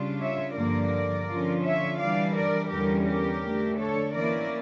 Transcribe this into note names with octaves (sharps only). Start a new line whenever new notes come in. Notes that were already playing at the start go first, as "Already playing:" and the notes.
Already playing: C#3 G3 D4 F4
C#5 E5
G2 D3 F3 A#3 A#4 D5
D3 F3 C#4 F4
C#5 E5
E3 G3 D4 D5 F5
A#4 D5
E2 D3 G3 C#4 G4 A#4
G4 A#4
D3 A3 D4
A4 C#5
E3 A#3 C#4 E4 A#4 D5